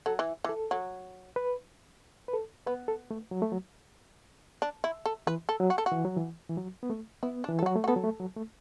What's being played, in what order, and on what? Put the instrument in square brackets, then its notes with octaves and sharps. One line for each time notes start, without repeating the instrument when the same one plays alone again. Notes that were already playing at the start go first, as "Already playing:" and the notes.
[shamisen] F#3 [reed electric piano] A4
[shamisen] E3
E3
[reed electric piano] A4
[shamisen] F#3
[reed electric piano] B4
B4
A4
[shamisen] B3 [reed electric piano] B4
[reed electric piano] A4
A3
F#3
A3
F#3
[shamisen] D4
E4
A4
[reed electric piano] E3 [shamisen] B4
[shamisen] A4
[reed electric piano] F#3
[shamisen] F#4
A4
F#4
[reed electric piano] E3
F#3
E3
E3
F#3
B3
A3
[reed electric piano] B3 [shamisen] E4
[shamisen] D4
[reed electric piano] E3
[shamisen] A4
[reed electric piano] F#3 [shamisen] F#4
[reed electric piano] A3
[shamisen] F#4
[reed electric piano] B3 [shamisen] A4
[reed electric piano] F#3
A3
F#3
A3